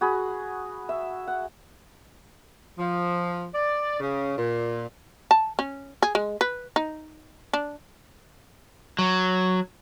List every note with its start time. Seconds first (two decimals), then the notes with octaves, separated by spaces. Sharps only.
0.01 F#4 G#4 B5
0.89 E5
1.27 F#5
2.79 F3
3.54 D5
4.00 C#3
4.37 A#2
5.31 A5
5.59 C#4
6.03 G#4
6.15 G#3
6.41 B4
6.76 D#4
7.53 D4
8.99 F#3